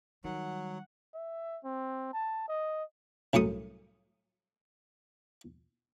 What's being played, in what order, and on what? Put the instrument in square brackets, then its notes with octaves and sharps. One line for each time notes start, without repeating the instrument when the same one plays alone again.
[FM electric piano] D#3 [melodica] F#3 [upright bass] G3 [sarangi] F#5
[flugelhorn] E5
C4
A5
D#5
[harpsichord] C2 F#2 A2 C#6 D#6